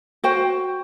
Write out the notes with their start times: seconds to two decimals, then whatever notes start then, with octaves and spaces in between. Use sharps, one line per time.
0.24 F#4 C5 G5